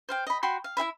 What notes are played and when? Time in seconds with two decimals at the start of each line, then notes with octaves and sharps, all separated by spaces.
0.09 C5 F5 G5
0.27 D#5 B5
0.43 F#4 G5 B5 C6
0.64 F5
0.77 E4 G#4 E5 B5